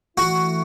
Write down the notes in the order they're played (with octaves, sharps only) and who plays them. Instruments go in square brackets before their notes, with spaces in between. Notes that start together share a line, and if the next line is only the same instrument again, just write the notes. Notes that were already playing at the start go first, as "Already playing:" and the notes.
[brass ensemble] E3 A3 E4 [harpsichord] F#4